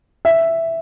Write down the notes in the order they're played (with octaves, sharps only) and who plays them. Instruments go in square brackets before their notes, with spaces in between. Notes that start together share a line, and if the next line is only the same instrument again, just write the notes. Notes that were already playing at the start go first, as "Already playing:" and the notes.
[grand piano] E5